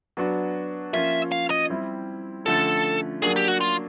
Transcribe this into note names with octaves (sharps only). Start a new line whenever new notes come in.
F#3 B3 D4 F#4
F3 A#3 C#4 F4 E5
F5
D#5
G3 C4 E4
D3 F3 A3 C#4 A4
F#3 A#3 D4 G#4
G4
F#4
F4